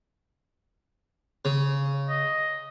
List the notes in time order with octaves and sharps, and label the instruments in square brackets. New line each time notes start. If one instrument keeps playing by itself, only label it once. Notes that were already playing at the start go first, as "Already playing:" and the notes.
[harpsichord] C#3
[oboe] D#5